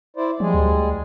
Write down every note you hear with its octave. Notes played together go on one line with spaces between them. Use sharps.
E4 C5 D5
F3 G3 G#3 G#4
D2